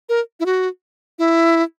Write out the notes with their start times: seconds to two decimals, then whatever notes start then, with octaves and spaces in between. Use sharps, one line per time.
0.09 A#4
0.40 E4
0.46 F#4
1.19 E4